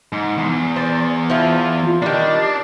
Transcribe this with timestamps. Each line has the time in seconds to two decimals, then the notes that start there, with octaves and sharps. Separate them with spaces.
0.13 G#2
0.38 E2
0.76 C5 D5
1.30 F3 E4 F4
2.02 D#3 G3 D4